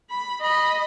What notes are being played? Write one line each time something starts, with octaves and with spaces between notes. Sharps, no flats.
B5
D#5 B5